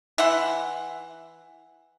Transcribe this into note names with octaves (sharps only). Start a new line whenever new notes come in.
E3 E5 F#5 C6